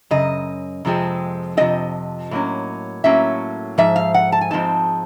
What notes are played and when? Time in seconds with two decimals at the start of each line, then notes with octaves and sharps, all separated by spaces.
0.11 F#2 C#3 D#5
0.85 F2 C3 F3 G#3 C4
1.57 F2 C3 F3 G#3 C4 D#5
2.31 A2 F#3 A#3 C#4
3.04 A2 F#3 A#3 C#4 E5
3.78 G#2 F3 E5
3.96 F5
4.14 F#5
4.32 A5
4.41 G#5
4.51 G#2 F3 G#3 C4 D#4 A5